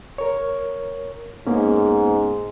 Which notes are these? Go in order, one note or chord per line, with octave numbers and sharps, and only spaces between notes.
A#4 C#5
G#2 A#3 B3 C#4